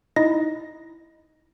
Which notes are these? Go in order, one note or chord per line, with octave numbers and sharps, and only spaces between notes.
D#4 E4 D#5 A#6